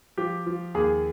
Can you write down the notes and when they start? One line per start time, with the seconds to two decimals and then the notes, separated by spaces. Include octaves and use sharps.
0.18 F3 G4
0.47 F3
0.75 D#2 G#4